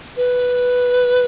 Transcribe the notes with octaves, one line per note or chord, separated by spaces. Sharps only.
B4